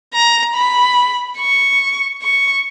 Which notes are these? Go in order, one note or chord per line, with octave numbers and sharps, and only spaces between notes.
A#5
B5
C#6
C#6